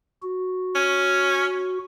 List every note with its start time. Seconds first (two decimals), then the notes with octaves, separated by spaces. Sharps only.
0.23 F#4
0.75 C#4